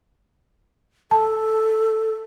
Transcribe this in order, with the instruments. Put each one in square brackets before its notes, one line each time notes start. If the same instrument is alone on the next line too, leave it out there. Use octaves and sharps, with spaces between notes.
[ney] A4 [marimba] A5